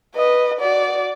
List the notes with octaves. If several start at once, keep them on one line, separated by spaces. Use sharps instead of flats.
B4 D#5
F#4 D5